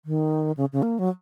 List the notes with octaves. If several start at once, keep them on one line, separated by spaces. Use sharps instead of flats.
D#3
C#3
C#3
A#3
F#3